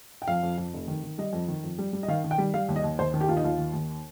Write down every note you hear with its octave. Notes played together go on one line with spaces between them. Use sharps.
G5
F2 F5
F2
F2
F1
D#3
D#3
G3 D#5
F2
D#3
F2
G3
G3
D#5
D#3 F5
D#3
G5
G3
G3 F5
D#2
D#5
D#2
D#2 C5
D#3
G4
D#2 F4
D#4
D#2 F4
D#3
D#2